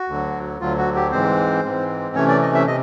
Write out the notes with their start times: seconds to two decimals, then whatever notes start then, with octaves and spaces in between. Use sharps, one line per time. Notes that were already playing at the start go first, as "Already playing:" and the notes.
Already playing: F#4
0.08 D2 D3 F#3
0.60 D2 D3 F#3 F4
0.78 F#4
0.95 G4
1.11 G#2 E3 G#3 C4 C5
1.64 G#2 E3 G#3 C4
2.15 C3 E3 A3 C#4 C#5
2.28 D5
2.42 D#5
2.54 E5
2.67 C3 D#5